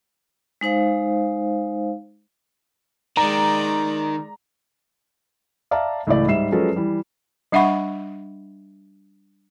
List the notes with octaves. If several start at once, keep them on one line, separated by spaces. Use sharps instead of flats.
G#3 D#4 C5 F5
D#3 G#3 D5 A#5
D5 E5 F5 A5 A#5
C#2 A2 E3 D5
G#2 G3 E5 C7 E7
F3 F#3 G#3 C#4 A4 B4
E3 G3
G3 D4 E5 F#5 B5 C#6